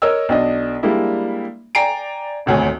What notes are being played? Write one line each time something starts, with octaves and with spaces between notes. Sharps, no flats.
A#4 C#5 D#5 E6
B1 D4 D#5
G3 G#3 A#3 D4 E4
D5 G5 G#5 A#5 C7 D7
D#1 G#1 D2 C#5 G#5